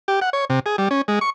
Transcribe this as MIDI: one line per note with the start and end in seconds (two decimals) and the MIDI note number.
0.08 0.20 67
0.22 0.30 78
0.33 0.45 73
0.50 0.60 48
0.66 0.76 68
0.78 0.89 55
0.91 1.02 61
1.08 1.19 56
1.21 1.30 85